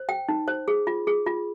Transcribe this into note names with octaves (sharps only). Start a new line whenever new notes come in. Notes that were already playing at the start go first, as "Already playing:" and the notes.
Already playing: C5
G5
D#4
C5
G#4
F4
G#4
F4